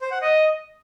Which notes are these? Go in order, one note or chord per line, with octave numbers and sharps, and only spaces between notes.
C5
F#5
D#5